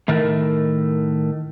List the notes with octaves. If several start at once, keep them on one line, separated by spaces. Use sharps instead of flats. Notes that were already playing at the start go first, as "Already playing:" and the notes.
A2 D#3 A3 A#4